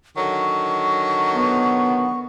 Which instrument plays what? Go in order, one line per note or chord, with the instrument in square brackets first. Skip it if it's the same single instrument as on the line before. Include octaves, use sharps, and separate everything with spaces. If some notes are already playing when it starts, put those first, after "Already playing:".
[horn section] D3 D#3 F#3 [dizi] C#6
[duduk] B3